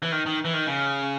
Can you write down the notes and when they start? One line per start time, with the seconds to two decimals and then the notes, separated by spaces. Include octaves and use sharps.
0.02 E3
0.12 D#3
0.26 D#3
0.45 E3
0.54 D#3
0.67 C#3